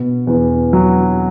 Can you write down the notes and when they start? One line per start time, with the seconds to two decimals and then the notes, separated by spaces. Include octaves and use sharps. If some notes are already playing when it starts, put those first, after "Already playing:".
Already playing: B2
0.27 E2
0.73 F#3